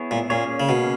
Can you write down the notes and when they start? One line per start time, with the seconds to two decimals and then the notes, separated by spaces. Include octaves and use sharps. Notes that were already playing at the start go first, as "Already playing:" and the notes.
Already playing: B3 E4 G#4 C#5
0.11 A#2
0.30 A#2 A#3 C#4 G#4 C#5
0.60 C#3
0.69 B2